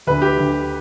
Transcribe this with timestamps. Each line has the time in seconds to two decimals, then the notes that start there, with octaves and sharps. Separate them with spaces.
0.07 D2 D3 B4
0.22 G4
0.38 D2 D3